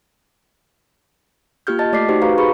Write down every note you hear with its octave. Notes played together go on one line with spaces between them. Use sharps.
A#3 F4 G4 F6 G6
D#5 A5 A6
A3 D5 D6 B6 C7
D#4 F#4 G4 C5
F#4 B4 F5 A#5 C#6
G#4 B4 B5 C#6